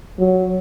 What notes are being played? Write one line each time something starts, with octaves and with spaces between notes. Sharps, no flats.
F#3